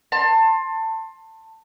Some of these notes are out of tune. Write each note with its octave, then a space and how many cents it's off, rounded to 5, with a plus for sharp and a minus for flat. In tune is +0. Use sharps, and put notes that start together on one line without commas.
A5 +20 C6 +20